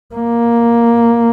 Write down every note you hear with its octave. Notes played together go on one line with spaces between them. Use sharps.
A#3